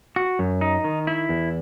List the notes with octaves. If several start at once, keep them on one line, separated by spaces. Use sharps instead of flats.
F#4
F#2
D#4
D#3
E4
E2